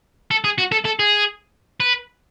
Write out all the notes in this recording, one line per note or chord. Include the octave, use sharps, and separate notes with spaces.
A4
G#4
F#4
A4
A4
G#4
B4